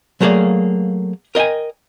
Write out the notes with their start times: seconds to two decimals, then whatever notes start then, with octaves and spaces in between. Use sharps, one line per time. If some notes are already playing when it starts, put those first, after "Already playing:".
0.21 F#3 A3 A#3 G#4 D5 F5
1.35 A#4 D#5 F5 G5 G#5